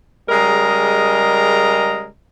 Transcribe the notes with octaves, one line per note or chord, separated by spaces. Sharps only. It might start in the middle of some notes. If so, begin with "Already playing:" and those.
C#3 G3 G#3 A#4 D#5 A#5